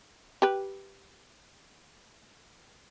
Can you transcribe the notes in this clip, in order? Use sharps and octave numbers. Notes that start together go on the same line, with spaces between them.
G4 B4